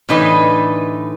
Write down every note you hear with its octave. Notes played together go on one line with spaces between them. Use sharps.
A2 D3 E3 D#4 B4